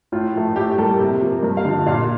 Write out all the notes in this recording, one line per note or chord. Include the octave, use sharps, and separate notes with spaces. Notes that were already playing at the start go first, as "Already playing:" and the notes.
A2 F4
F3 A3
A2 G4
G3 A#3 A4
C3
F3 A#3
G2 A#4
F5
D3 F3
A#2 F5